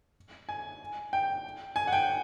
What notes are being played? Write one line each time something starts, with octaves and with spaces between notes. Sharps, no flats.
G#5
G5
G#5
F#5
G5